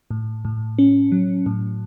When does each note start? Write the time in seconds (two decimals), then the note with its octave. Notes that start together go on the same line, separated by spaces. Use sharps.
0.11 A2
0.45 A2
0.79 C#4
1.12 F#3
1.46 A2